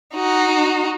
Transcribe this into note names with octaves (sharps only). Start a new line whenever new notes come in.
D#4 F#4